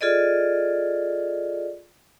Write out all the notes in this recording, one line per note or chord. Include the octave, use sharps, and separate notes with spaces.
F4 G#4 A4 D5 D#5